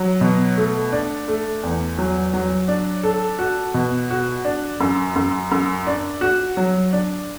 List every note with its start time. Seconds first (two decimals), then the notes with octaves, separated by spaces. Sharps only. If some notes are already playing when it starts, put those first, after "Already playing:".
Already playing: F#3
0.21 B2
0.57 A3
0.92 D4
1.28 A3
1.63 E2
1.99 F#3
2.34 F#3
2.68 D4
3.03 A4
3.39 F#4
3.74 B2
4.11 F#4
4.45 D4
4.80 F#2
5.15 F#2
5.51 F#2
5.87 D4
6.21 F#4
6.57 F#3
6.93 D4